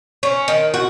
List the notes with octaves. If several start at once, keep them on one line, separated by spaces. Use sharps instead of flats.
C#4
D#3
F#4